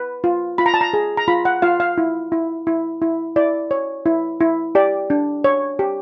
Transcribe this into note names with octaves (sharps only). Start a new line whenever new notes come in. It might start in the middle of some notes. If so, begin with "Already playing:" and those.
Already playing: B4
F4
F4 B5
A#5
A5
A#5
G#4
A#5
F4 B5
F#5
F4 F5
F5
E4
E4
E4
E4
E4 D5
C#5
E4
E4
G4 D5
D4
C#5
G4